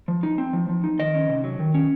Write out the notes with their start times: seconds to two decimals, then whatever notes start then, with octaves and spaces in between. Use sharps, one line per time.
0.08 F3
0.23 D#4
0.38 C4
0.53 F3
0.69 F3
0.84 D#4
0.99 D#3 D#5
1.15 C#4
1.29 C3
1.44 F#3
1.59 D#3
1.74 C#4